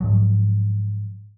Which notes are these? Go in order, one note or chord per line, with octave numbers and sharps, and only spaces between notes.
G#2 F3 F#3